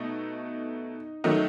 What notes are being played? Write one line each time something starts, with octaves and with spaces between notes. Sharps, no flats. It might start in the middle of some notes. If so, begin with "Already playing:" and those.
Already playing: B2 A3 D#4
D#3 F#3 A3 D#4